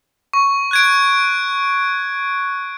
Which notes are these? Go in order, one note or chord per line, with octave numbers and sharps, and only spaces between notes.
C#6
F#6 G#6 D7